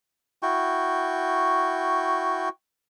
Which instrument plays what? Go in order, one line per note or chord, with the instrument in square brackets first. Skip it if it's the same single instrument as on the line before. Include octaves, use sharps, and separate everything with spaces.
[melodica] E4 F#4 G5 C#6